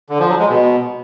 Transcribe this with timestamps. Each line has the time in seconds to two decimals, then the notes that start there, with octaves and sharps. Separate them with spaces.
0.09 D3
0.19 F3
0.29 F#3
0.39 G#3
0.49 B2